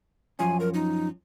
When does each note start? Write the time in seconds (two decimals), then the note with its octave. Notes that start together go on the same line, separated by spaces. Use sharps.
0.39 F#2 F3 C#4 G#5
0.60 A#4
0.74 D#4